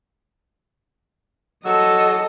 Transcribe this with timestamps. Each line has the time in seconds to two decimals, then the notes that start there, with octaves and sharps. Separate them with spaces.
1.65 F#3 A4 D#5 E6